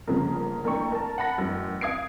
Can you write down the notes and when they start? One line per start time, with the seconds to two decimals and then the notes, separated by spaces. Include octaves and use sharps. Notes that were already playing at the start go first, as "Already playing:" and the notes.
0.07 G1 C#3 F3 A#3
0.64 A1 A#3 D4 G5 C#6
0.92 A#4 A5
1.18 F#5 A5 B5 A#6
1.38 A1 F#2
1.81 F5 D#6 G#6 C7 D7